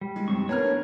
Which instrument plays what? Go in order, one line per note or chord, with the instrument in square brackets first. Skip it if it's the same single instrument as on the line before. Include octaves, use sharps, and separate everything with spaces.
[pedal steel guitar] G3
[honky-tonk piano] G#3
[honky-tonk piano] F2 C3 [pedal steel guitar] C4 C#6
[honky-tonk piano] B3 A#4 F6 [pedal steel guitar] D4 B4 C#5